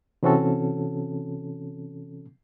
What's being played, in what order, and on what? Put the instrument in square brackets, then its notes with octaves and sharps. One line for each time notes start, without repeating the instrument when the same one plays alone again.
[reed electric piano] C3 E3 C4 C#4 F#4 A4